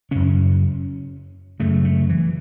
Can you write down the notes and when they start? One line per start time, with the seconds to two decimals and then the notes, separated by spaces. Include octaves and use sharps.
0.11 F#2 C#3 C#4
1.60 F#2 C#3 A3
1.85 A3
2.09 E3